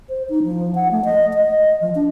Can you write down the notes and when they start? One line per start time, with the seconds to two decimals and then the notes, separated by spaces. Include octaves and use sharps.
0.09 C5
0.29 D#4
0.43 F3
0.75 F#5
0.91 A3
1.05 D#5
1.35 D#5
1.81 F3
1.95 D4